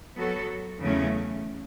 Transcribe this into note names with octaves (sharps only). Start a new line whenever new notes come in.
F#3 B3 F#4 A4
E2 C#3 F#3 A3 C#4